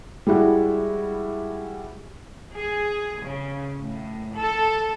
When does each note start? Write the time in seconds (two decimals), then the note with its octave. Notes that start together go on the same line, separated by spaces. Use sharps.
0.27 G3 G#3 E4 F#4
2.55 G#4
3.23 C#3
3.80 A2
4.35 A4